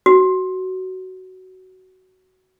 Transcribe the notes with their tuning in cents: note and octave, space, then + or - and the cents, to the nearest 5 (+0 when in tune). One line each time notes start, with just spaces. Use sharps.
F#4 +15